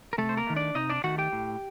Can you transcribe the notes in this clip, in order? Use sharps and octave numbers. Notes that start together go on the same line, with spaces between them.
A#4
C3 A3 A4
C5
A#3 A#4
D#3 A3
D4 D5
C3 D#4 D#5
D4 D5
D#3 A3 F#4 F#5
G4 G5
A2